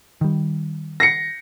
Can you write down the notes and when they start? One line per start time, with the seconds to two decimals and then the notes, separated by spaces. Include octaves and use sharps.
0.21 D#3 G3
1.00 A#6 C7 C#7